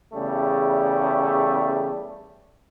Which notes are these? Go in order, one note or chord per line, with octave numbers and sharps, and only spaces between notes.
E2 C#3 G3 A3